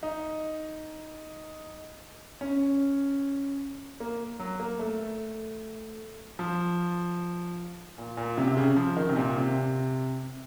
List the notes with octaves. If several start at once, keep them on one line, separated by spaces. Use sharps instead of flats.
D#4
C#4
A#3
F#3
A#3
A3
F3
A#2
A#2
C3
C3
C#3
F3
D#3
C3
A#2
C3